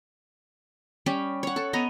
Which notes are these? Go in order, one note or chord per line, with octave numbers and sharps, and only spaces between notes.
G3 C#4 G4
C#5 F#5
A4 A5
B3 C#5 D#5 A#5